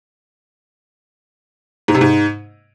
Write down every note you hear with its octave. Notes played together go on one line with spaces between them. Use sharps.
G#2
C3
G#2